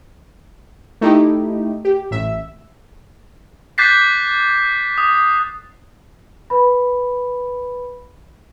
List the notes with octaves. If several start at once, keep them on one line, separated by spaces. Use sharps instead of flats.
A3 D#4 E4 G4
G4
A1 E5
D6 F#6 G6 A6 B6 C7
D#6
B4 B5